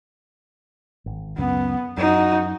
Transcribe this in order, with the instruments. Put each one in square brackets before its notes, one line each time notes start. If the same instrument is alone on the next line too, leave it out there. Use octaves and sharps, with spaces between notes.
[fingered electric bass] G#1
[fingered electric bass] C#2 F#2 C#3 [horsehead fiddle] B3
[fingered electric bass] F#2 [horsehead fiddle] D#4 F#4